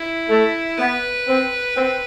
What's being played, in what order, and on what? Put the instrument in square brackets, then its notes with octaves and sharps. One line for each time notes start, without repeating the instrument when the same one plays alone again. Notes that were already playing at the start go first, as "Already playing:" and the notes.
Already playing: [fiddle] E4
[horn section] A3
[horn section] B3 [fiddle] B4
[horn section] C4
C4